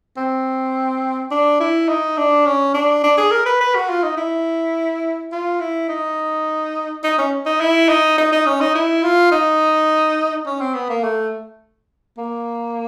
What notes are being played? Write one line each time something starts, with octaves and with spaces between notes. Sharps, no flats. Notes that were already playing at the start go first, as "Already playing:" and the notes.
C4
D4
E4
D#4
D4
C#4
D4
D4
G#4
A#4
B4
B4
F#4
F4
D#4
E4
F4
E4
D#4
D#4
C#4
D#4
E4
D#4
D#4
D#4
C#4
D#4
E4
F4
D#4
C#4
C4
B3
A#3
A3
A#3